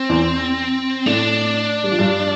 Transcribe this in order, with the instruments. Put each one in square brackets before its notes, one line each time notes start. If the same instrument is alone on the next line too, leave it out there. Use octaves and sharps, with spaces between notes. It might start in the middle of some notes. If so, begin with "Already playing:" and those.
Already playing: [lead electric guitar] C4
[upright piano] E2 E3
[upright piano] A2 A3 [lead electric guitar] D4
[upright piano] G3
F3
G2 G3